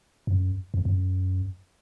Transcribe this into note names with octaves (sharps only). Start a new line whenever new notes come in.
F#2
F2
F#2